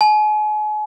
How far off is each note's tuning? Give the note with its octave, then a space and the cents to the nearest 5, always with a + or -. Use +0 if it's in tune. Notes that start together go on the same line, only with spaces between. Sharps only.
G#5 +40